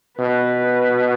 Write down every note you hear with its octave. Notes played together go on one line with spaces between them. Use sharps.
B2 B4